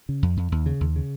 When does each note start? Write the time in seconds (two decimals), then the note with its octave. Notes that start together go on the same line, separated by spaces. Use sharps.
0.09 C#3
0.22 F2
0.37 F2
0.52 D#2
0.66 C#3
0.81 D#2
0.96 C#3